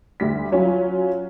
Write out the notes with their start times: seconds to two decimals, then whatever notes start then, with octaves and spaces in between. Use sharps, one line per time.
0.20 D2 G3 B6
0.52 F#3 C#4 F4